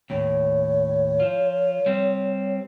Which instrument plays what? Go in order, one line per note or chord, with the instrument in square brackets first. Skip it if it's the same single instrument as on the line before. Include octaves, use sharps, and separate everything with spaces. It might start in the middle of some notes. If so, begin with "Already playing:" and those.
[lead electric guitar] D#2 A2 [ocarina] C#5
[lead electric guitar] F3 F4
G3 C4